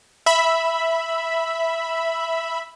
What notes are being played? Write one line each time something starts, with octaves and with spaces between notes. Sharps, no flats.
E5 B5